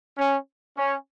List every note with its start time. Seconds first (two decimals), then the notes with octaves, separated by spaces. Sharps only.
0.18 C#4
0.76 C#4